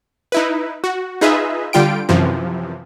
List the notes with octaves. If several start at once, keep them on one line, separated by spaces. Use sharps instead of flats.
D#4 E4 B4
F#4
D#4 F4 G#4 B4 D#5 E5
D3 G3 F4 G5 D7
F#2 C3 E3 F3